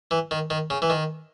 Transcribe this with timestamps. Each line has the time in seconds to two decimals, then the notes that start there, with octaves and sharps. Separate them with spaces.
0.11 E3
0.31 D#3
0.50 D#3
0.70 C#3
0.82 E3
0.90 D#3